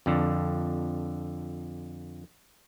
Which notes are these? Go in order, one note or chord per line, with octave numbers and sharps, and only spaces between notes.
F2 D3